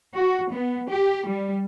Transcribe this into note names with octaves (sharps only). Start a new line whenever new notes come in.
F#4
B3
G4
G3